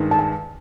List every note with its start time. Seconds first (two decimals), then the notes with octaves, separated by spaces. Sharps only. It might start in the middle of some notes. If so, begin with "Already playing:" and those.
Already playing: G2 D#3 G#3
0.11 A5
0.19 G#5